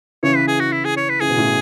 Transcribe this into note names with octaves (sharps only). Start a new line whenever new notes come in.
C#3 E3 C#5
B4
G#4
F#4
E4
G#4
C#5
B4
C#3 E3 G#4
B2
A2 C#3